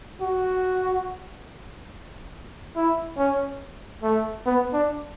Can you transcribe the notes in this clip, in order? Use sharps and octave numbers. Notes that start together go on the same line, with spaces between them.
F#4
E4
C#4
A3
B3
D4